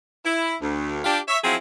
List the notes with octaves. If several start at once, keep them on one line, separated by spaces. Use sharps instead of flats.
E4
D2
D4 F4 G4
C#5 E5
F3 F#3 C4 E4 G#4